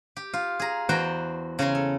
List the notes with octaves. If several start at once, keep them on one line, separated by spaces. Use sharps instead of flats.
G4
F4
G#4 A#5
E2 F#4 C5 G5 A#5
C#3 C#5 A#5 C6
A4